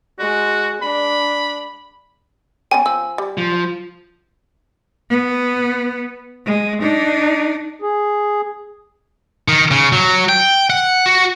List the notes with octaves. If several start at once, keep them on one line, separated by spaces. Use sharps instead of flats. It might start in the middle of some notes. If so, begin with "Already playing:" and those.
G#3 F#4
D4 B5
B3 C#4 G5 G#5
F3 E6
G3
F3
B3
G#3
D4 D#4
G#4
D#3
C#3
F#3
G5
F#5
F#4